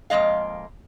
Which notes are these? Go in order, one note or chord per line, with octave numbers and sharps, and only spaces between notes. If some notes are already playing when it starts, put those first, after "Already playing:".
F2 A#2 G#3 D#5 F5